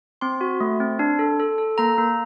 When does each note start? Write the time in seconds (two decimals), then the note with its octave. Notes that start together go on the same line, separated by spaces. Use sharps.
0.21 C4 C6
0.41 F#4
0.60 A3
0.80 C4
0.99 D4
1.19 A4
1.40 A4
1.58 A4
1.78 A#3 A#5
1.98 A#3